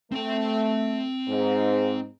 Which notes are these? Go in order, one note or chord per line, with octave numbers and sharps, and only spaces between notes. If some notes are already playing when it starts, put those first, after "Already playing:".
A3 C4 G5
G#2